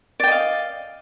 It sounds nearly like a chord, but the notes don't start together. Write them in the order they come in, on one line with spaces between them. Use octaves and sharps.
D5 G5 D#5 F5